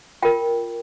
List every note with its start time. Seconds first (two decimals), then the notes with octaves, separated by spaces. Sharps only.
0.22 F4 A#4 G5